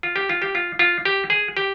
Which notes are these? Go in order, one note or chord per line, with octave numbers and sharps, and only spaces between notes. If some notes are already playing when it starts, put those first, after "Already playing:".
F4
G4
F4
G4
F4
F4
G4
G#4
G4